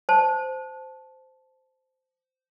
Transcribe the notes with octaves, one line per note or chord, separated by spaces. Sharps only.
C5 A5